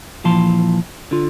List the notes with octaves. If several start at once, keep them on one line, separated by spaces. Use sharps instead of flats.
A#2 E3 F3 F5 A5 C6
D3 F4